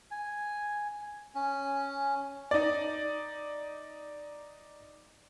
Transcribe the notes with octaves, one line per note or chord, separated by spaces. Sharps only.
G#5
C#4
D#4 D5